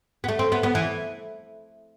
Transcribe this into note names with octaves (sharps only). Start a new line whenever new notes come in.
B3
A3
C4
B3
B3
E3